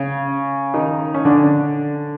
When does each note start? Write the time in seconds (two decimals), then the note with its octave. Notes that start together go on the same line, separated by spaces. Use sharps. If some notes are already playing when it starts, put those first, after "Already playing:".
Already playing: C#3 C#4
0.74 D#3 D#4
1.14 C#4
1.25 D3 D4